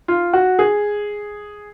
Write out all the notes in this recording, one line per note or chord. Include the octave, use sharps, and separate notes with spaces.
F4
F#4
G#4